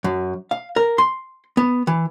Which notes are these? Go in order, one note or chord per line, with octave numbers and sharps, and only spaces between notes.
F#2
F5
A#4
C6
B3
E3